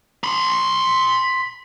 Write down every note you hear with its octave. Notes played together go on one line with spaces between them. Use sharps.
B5 C6